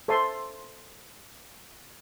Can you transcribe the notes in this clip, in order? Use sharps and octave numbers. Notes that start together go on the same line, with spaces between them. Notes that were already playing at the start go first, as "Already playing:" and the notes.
A4 C5 E5 A5 C6